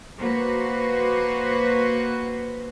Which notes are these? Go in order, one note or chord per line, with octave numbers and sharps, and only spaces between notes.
A#3 F#4 B4 C5